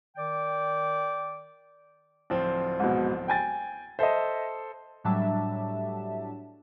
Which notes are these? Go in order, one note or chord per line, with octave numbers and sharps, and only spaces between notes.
D#3 D5 G5 D6
D1 F3 C4
G#2 B2
G5 G#5 A6
A4 C5 D#5 E5
A2 F#3 G3 D4 E5 A5